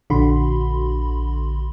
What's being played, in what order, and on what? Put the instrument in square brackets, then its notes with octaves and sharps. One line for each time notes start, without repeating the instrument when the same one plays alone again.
[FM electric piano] A#1 D3 F#4 B5 C6